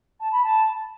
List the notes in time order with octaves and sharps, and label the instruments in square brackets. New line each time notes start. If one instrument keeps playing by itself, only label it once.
[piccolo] A5
B5
A5